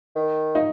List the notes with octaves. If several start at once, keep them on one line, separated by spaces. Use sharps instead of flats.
D#3
D#4